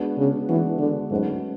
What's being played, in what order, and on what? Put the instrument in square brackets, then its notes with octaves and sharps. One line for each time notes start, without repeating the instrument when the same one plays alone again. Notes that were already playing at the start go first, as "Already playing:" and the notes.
Already playing: [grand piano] G#3 B3 D4 F#4
[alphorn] C#3
[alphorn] E3 [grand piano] G#3 B3 D4 F#4
[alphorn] D3
[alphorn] G#2 [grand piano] F#3 A3 C#4 F#4 B4